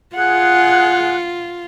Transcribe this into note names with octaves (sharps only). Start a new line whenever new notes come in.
F4 G#4 F#5 F#6